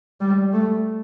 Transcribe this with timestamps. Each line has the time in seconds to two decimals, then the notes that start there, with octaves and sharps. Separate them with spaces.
0.21 G3
0.53 A3